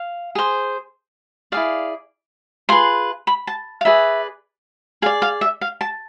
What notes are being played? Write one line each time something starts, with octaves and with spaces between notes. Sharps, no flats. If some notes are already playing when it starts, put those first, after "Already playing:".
Already playing: F5
G#4 C5
E4 G#4 D5 F5
F4 G#4 B4 C6
B5
A5
F5
G#4 B4 D5 E5
G#4 D5 F5
F5
E5
F5
A5